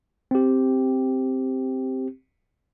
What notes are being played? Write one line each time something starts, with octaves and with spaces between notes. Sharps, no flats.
C4 G4